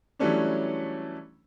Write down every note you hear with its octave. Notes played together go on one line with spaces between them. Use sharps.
E3 F#3 G3 A3 C#4 D4